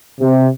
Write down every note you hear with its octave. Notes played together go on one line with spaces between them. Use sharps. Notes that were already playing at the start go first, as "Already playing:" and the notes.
C3